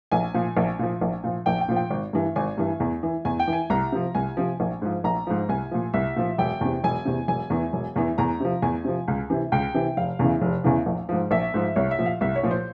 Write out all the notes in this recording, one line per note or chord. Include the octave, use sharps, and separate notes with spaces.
A#1 G#5
A#2 F3
A#1
A#2 F3
A#1
A#2 F3
A#1 G5
G5
A#2 F3
G5
G#1
G2 E3
G#1 G#5
G2 E3
E2
E3
E2 G#5
G5
E3
G#5
C2 A#5
C3 F3
C2 G#5
C3 F3
A#1
G#2 F3
A#1 A#5
G#2 F3
C2 G#5
A#2 F3
C2 E5
A#2 F3
E1 G5
E2 C3
E1 G#5
E2 C3
E1 G#5
E2 E3
E1
E2 E3
E2 A#5
C3 F3
E2 G#5
C3 F3
C#2
C3 E3
C#2 G5
C3 E3
F1 F5
E2 C#3 E3
F1
E2 C#3 E3
A#1
G#2 F3
A#1 E5
G#2 F3
C2 C#5
E5
A#2 F3
F5
C2 E5
C#5
A#2 F3
C5